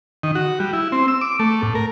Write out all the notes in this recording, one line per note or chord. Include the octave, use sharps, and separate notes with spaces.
D#3
F#4
G3
E4
C4
E6
D6
A3
A2
A#4